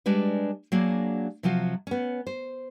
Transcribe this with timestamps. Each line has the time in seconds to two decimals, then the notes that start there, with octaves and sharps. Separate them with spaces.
0.06 G3 G#3 D4 B4
0.72 F#3 A#3 D4 F#4 G#4
1.43 C3 F3 F#3 F4 F#4
1.87 B3 C#4
2.27 C5